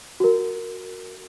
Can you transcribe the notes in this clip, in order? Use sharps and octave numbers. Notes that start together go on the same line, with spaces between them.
F#4 A#4